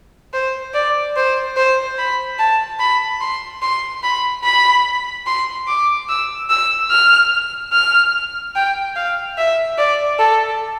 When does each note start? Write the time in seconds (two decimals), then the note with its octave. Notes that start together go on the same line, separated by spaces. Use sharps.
0.34 C5
0.74 D5
1.16 C5
1.57 C5
1.98 B5
2.39 A5
2.80 B5
3.21 C6
3.62 C6
4.04 B5
4.44 B5
5.27 C6
5.68 D6
6.09 E6
6.50 E6
6.91 F6
7.73 F6
8.56 G5
8.96 F5
9.38 E5
9.78 D5
10.19 A4